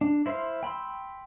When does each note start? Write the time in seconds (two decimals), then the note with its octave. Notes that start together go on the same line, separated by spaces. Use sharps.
0.01 D4
0.26 E4 C5 E5 F5 C6
0.63 G5 B5 C6 E6